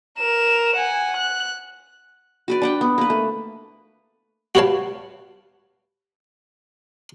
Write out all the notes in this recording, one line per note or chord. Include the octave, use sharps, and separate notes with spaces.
A#4 E7
F#5 G#5
F#6
F#4 B4 D5
D4 F#5 G5
B3
A#3 B4
A3
F#4 G4 B4 C#5 F5 A5